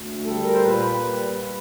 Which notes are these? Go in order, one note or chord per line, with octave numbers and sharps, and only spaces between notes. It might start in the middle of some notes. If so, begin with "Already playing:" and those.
Already playing: D2
G3 A4
A#4
C5
A#2 B4
G3
G3